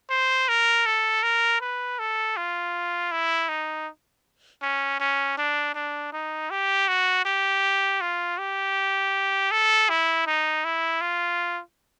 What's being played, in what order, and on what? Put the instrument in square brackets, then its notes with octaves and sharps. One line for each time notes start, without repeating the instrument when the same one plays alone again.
[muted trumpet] C5
A#4
A4
A#4
B4
A4
F4
E4
D#4
C#4
C#4
D4
D4
D#4
G4
F#4
G4
F4
G4
A4
E4
D#4
E4
F4